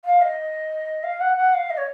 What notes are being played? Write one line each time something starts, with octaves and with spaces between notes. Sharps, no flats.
F5
D#5
F5
F#5
F#5
F5
D#5
C#5